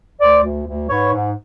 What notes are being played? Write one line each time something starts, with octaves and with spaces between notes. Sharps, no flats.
D2 C5 D5
D2
D2
G#2 B4 C#5
G#2